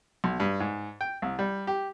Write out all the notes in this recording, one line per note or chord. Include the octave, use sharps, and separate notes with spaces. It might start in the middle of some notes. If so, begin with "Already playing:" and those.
B1
G2
G#2
G5
C2
G3
G4